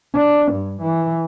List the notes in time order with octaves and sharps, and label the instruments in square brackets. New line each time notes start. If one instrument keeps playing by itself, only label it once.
[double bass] D4
G2
E3